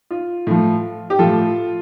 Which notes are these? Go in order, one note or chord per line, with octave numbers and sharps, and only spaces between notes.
F4
A2 F3
G4
A2 F3 F4 A4